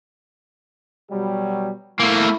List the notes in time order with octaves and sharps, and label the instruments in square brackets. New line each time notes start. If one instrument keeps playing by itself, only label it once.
[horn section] B2 F#3 G3
[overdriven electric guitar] A3 A#3 [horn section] E4